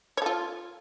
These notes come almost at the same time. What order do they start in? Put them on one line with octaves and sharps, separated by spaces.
C#5 A4 F4